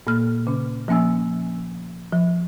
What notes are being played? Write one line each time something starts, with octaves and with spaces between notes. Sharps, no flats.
A#2 A#3 F6
C#3 C#4
F3 A#3 C#4 G#5 E6
F3